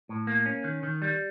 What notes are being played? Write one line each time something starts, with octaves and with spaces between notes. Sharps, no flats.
A2
A#3
C#4
D#3
D#3
G3